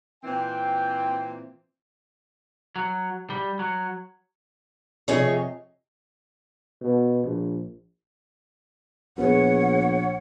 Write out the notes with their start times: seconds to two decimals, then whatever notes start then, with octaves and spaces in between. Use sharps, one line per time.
0.23 A#2 E3 C4 G5
2.76 F#3
3.30 G3
3.59 F#3
5.08 F2 C3 A3 G#4 C#5 D#5
6.81 B2
7.23 A#1
9.18 A#1 B3 G#4 C#5 F#5